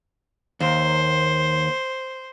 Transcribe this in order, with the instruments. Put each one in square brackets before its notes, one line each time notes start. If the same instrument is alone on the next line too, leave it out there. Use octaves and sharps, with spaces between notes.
[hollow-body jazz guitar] D#2 [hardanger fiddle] C5